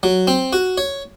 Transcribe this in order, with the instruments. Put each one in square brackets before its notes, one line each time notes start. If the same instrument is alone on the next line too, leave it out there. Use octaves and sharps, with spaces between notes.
[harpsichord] F#3
C4
F#4
C#5